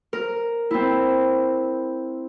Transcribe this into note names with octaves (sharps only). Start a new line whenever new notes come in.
A#4
C4 E4